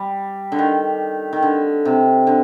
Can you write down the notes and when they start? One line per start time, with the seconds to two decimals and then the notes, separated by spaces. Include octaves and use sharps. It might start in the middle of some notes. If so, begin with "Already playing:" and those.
Already playing: G3
0.52 D3
0.59 D#3
1.33 D#3
1.42 D3
1.85 C3
2.27 D3